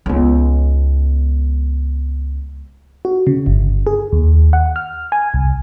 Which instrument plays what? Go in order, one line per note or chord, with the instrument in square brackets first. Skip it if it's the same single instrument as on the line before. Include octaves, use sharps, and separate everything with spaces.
[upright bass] C#2 B3
[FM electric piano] F#4
C#3
G1
G#4
D#2
F#5
F6
G#5
C2